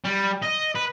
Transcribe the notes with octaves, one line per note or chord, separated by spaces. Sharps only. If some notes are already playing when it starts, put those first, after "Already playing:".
G3
D#5
B4